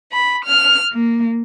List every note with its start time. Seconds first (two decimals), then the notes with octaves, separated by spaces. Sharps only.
0.12 B5
0.45 F6
0.91 A#3